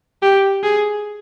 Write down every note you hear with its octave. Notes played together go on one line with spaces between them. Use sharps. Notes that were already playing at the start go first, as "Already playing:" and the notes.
G4
G#4